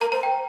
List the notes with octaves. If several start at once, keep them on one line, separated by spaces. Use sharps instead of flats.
A#4 A#5
C5 A#5
G5